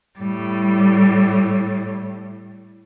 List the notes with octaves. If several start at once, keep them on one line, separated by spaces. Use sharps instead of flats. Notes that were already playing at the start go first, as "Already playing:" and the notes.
A2 G3